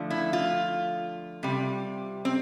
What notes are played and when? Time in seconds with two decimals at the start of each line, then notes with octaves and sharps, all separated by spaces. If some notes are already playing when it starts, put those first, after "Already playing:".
Already playing: D3 F3 A3
0.10 E4
0.33 F4
1.43 C3 G3
2.25 C4